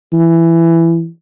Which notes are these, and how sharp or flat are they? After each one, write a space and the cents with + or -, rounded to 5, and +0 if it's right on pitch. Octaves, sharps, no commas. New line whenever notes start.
E3 +10